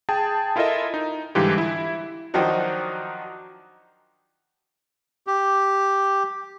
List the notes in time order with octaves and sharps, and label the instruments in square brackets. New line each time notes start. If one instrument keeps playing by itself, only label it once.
[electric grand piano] G#4 G5 A5
E4 F4 A4 A#4 D#5 E5
D#4
G#2 D3 E3 G3 F4 G4
E4
[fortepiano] D#3 F3 F#3 D4 D#4 F#4
[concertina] G4